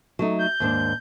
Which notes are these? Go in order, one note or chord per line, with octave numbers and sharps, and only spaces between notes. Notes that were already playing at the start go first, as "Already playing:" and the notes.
F#3 A3 D#4
G6
D#2 G#2 D4